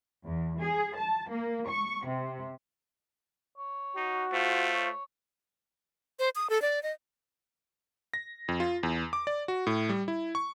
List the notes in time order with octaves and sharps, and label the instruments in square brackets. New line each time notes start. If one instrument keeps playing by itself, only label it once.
[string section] E2
G#4
A5
A#3
C#6
C3
[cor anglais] C#5
[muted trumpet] D#4 [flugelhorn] F#4
[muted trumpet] A3 [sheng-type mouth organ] F4 C5
[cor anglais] C#5
[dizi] C5
D#6
A4
D5
D#5
[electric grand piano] A#6
F2
F4
E2
D6
D5
F#4
A2
G3
E4
C#6